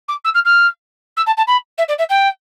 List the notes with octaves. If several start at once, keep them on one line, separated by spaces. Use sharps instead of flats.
D6
E6
F6
F6
E6
A5
A5
B5
E5
D5
E5
G5